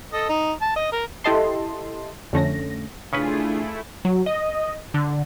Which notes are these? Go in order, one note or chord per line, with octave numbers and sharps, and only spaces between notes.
A4 D#5
D#4
A5
D#5
A#4
E4 G4 A4 D#5 A5 C6
F2 D3 A3 C#4 A#6
C#3 A3 C#4 D4 E4 F4 G#4 B4
F#3
D#5
D3